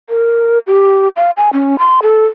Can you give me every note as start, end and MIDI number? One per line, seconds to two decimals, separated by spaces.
0.10 0.59 70
0.67 1.08 67
1.17 1.31 77
1.37 1.50 80
1.53 1.76 61
1.79 2.00 84
2.02 2.26 69